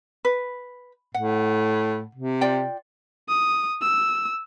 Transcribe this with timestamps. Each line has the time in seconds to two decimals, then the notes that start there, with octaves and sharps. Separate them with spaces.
0.25 B4
1.14 A2 F#5
2.15 C3
2.41 F4 D5 G5
3.29 D#6
3.82 E6